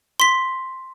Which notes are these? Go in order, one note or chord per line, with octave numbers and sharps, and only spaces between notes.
C6 B6